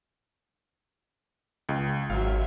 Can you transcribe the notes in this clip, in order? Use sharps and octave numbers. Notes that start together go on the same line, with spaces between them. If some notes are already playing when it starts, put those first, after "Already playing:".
C#2
G#1 F#3 E5 F5